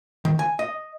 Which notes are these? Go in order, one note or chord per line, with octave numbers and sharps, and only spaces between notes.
D#3
G#5
D#5